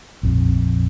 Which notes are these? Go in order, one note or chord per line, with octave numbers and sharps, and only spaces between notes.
A#1 F2